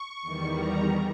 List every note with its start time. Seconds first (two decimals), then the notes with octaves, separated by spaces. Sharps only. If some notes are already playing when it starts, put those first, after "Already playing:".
Already playing: C#6
0.22 E2 D#3 G3
0.55 A#5